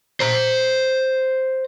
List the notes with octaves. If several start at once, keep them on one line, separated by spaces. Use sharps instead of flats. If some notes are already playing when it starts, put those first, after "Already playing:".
C5 A#5